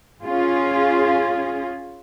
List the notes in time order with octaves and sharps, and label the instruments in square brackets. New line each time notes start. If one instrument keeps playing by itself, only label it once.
[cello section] C#4 F4 G#4